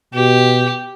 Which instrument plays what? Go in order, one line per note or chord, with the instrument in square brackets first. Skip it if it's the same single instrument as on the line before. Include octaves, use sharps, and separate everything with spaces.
[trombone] B2 [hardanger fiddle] G4